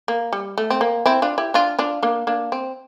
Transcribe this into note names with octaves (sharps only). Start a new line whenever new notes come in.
A#3
G3
A3
C4
A#3
C4 E4
D4 F4
E4 G4
D4 F4
D4 F4
A#3 D4
A#3 D4
C4